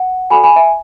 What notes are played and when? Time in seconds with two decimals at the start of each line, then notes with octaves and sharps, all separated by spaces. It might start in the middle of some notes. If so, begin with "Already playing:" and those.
Already playing: F#5
0.30 F#4 A4 D5 G#5 B5
0.44 G#5 B5
0.56 E5 G#5